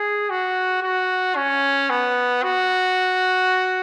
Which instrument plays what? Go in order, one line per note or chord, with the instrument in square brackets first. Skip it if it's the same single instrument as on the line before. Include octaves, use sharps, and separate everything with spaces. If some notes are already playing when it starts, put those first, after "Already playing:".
Already playing: [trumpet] G#4
F#4
F#4
C#4
B3
F#4